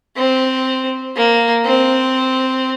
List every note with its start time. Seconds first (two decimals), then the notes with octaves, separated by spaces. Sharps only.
0.17 C4
1.16 A#3
1.65 C4